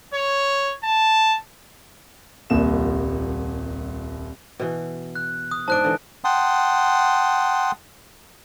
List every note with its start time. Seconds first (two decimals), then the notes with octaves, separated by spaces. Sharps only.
0.14 C#5
0.84 A5
2.50 D#1 C2 A#2 E7
4.60 B2 E3
5.15 F#6
5.51 D#6
5.68 G#2 D4 A5 F#6 D7
5.84 D3 E3
6.24 F#5 G5 A5 C6 D#6